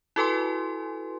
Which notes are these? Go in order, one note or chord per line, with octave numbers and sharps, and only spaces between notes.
E4 F#4 A4 B4 G#5 C6